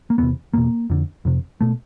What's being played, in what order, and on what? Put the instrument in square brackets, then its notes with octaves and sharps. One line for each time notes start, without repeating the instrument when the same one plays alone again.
[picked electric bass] A#3
E2 C3 B3
E2 B2 A#3
F2 D3
F2 C3
B2 A3